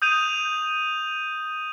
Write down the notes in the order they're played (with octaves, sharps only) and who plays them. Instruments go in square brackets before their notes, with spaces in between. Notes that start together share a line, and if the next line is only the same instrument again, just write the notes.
[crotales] D#6 G6 D#7 F7